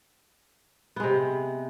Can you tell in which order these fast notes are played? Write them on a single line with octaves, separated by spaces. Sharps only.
B3 G#3 C3